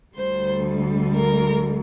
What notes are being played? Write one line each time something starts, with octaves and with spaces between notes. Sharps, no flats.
D2 D3 G3 C5
A#4